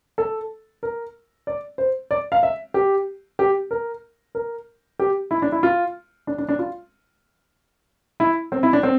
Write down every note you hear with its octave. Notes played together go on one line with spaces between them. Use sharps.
A4
A#4
D5
C5
D5
F5
E5
G4
G4
A#4
A#4
G4
E4
D4
E4
F4
D4
D4
D4
F4
E4
C4
E4
D4
C4